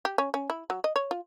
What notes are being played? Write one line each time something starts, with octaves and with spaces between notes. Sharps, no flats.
G4
C#4
C#4
E4
F#3
D#5
C#5
F4